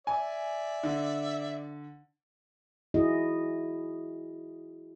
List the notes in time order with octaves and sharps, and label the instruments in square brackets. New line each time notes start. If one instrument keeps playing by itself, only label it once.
[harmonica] D5 E5 [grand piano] G#5
[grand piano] D3
[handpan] E4 F#4 G#4 D#5